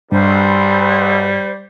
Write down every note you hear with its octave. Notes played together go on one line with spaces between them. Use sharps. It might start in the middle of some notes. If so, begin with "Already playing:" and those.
B1 G2 G3 C5